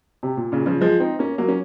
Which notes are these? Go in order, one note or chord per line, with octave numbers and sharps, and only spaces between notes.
C3
A#2
A#2 C#3
C#3 F3
F3 G#3
C4 D#4
A#3 C#4
F#3 A#3
C#4